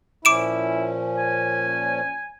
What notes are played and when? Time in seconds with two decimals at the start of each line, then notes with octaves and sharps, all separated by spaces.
0.25 A#2 F3 C#4 E4 D6 D7 E7
1.18 G#5